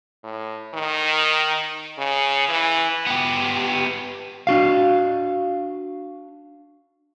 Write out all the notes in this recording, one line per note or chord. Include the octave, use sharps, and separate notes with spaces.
A2
D#3
C#3
E3
B3 G4
D4 F#4 F5